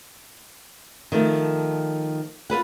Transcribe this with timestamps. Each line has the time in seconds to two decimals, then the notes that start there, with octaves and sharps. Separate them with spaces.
1.12 D#3 F3 A3
2.50 F4 A4 B4 F#5